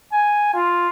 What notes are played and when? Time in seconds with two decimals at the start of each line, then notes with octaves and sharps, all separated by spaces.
0.13 G#5
0.54 F4